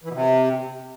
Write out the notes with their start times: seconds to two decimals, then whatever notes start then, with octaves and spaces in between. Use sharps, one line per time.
0.04 E3
0.09 B2
0.14 C3